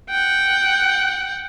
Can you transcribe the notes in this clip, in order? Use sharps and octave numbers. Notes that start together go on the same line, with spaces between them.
F#5 G5